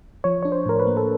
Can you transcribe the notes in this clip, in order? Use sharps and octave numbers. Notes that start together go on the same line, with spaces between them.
F3 C#5
D4 C#5
C5
A2 A#4
B4
A#3
A4